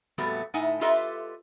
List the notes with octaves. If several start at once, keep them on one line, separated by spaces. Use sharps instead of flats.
F2 A#2 G3 A3 B3 F#4
A2 D#4 E5 F#5 G#5
F4 G4 A4 B4 D#5 E5